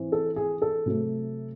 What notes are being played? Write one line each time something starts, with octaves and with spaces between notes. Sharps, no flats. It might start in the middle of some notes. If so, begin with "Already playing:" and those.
Already playing: E3 C4
A4
G#4
A4
C3 F#3 A3